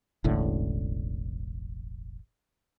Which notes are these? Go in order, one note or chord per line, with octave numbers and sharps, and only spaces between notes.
E1 A1 A2 D3